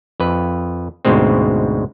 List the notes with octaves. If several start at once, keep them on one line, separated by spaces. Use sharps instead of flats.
F2 B4
D2 G#2 B2 G#3 C4